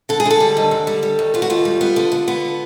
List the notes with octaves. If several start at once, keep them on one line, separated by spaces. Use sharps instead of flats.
D3 A4
G#4
D3 A4
G3
D#2
D3
G3
G3
D#2
B3 F4
F#4
D#2 F4
G3
B3
D3
D3
B3